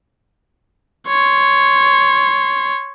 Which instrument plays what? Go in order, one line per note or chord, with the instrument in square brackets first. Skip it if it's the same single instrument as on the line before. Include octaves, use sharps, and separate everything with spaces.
[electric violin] C#5 C6